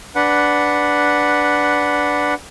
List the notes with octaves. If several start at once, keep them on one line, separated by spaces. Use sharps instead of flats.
D4 B4 F#5